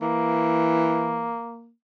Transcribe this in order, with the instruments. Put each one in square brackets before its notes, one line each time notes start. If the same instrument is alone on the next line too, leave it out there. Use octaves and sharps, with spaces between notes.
[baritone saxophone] E3 [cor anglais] A#3